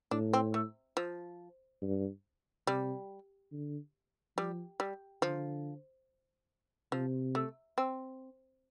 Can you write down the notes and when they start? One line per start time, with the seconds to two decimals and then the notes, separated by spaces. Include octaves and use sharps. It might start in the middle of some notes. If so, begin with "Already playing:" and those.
0.11 A2 D4
0.33 C4
0.54 A3
0.97 F3
1.82 G2
2.67 C3 G3
3.52 D3
4.37 F3 G3
4.80 G3
5.22 D3 F3
6.92 C3 F3
7.35 A3
7.78 C4